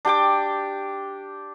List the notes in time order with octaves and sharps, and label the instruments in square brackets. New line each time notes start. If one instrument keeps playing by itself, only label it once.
[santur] D4 G4 G5 D6